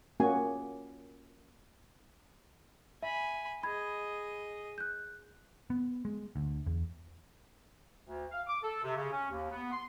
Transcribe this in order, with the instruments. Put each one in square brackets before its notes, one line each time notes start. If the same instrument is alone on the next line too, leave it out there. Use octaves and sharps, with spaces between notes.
[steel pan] A#3 C#4 F#4 G#5
[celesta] E5 [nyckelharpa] G#5 B5
[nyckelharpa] G#4 D#5 [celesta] B5 G#6
[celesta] F#6 G6
[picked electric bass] B3
G#3
D2
E2
[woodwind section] D2
F5
D6
A4
C3
C#3
C#4
D#2
B3
C6